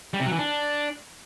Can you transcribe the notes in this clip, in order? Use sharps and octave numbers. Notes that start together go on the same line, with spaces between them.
G3
C3
F#3
E3
D4